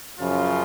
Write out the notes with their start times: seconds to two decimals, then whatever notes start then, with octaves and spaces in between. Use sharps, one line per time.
0.19 F#2 C#3 F3 F4